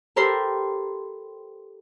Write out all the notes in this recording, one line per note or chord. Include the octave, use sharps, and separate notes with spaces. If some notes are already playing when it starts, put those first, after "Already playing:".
G4 A4 A#4 C5 B5 C6